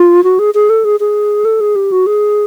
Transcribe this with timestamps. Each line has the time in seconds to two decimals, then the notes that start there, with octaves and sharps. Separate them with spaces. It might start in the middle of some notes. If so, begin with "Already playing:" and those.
Already playing: F4
0.24 F#4
0.39 G#4
0.54 G#4
0.69 A4
0.85 G#4
1.00 G#4
1.45 A4
1.60 G#4
1.76 G4
1.92 F#4
2.06 G#4